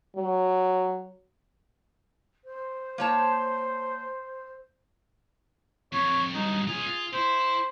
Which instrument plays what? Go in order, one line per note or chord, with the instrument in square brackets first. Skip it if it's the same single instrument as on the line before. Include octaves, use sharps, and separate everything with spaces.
[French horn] F#3
[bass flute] C5
[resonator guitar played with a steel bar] A#3 C#5 A5
[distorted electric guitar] F2 [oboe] C#5
[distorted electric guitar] G2 F#3 [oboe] D#4
[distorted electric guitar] C#4 F4 [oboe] G#4
[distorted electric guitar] F4
[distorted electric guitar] E4 [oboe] C5